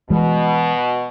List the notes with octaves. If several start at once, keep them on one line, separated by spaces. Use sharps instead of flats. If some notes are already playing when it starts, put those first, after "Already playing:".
B2 E3 G#3